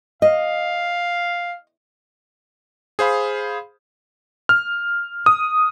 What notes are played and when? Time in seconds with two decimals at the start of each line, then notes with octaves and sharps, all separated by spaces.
0.22 D#5 F5
2.99 G#4 C5 F5 B5
4.49 F6
5.26 D#6